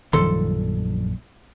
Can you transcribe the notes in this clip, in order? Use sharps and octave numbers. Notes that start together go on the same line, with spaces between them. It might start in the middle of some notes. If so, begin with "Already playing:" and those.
A#1 F#2 D#3 F3 G3 A4 C6